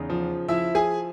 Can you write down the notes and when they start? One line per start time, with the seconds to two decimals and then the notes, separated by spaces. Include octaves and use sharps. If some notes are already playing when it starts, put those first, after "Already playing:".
Already playing: E2 C#3 D#4
0.10 F3
0.48 F3 E4 E5
0.75 G#4 G#5